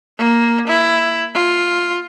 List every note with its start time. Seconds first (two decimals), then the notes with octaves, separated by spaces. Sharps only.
0.19 A#3
0.68 E4
1.34 F4